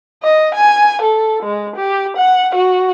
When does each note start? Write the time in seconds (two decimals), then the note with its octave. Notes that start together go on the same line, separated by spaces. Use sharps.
0.23 D#5
0.55 G#5
1.02 A4
1.43 G#3
1.76 G4
2.17 F#5
2.55 F#4